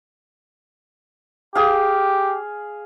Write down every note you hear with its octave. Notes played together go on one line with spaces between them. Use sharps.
G4 G#4 F5